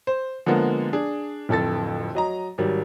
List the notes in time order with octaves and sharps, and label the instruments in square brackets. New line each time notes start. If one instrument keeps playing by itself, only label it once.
[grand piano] C5
D3 F3 G#3 A#3 B3
D4 G#4
D1 F2 A4 A6
F#3 D#5 A#5
G#1 F#3 G3